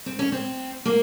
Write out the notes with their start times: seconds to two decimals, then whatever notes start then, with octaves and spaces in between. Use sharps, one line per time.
0.06 C4
0.19 C#4
0.32 C4
0.86 A#3